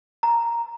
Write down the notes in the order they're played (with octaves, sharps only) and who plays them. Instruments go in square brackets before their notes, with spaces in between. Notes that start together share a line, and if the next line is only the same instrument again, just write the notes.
[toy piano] A#5